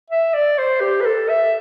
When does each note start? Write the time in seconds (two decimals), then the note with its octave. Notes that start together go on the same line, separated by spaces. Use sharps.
0.10 E5
0.34 D5
0.58 C5
0.81 G4
1.01 B4
1.05 A4
1.29 E5